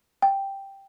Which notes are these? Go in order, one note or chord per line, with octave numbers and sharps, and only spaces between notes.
G5